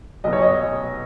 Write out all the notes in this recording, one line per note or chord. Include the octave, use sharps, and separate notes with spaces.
B1 B2 D#5
C#5
D#5